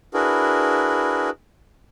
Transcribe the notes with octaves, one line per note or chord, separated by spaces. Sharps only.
D4 E4 F#4 G#4 A#4 B4